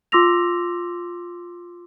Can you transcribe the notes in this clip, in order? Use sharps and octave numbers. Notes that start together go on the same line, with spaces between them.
F4 C6 D6 E6 A#6 F7